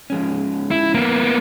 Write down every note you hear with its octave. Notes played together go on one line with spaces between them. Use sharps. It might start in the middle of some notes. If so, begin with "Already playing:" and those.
F3 G#3 C#4
E4
A#3 B3